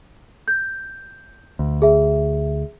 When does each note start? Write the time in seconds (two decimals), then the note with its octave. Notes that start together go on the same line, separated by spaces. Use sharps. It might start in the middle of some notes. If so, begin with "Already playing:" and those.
0.48 G6
1.59 D2
1.82 G#4 E5